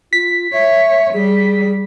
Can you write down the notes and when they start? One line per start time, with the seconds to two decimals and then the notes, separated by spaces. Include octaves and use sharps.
0.13 F4 B6
0.53 C#5 E5
1.14 G3 G#4